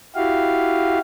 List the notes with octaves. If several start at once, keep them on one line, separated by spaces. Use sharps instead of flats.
E4 F#4 G4 F5